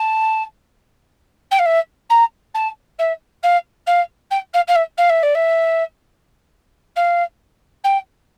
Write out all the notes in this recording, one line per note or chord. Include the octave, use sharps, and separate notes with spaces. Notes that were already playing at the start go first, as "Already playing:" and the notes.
Already playing: A5
G5
F5
E5
A#5
A5
E5
F5
F5
G5
F5
F5
E5
F5
E5
D5
E5
F5
G5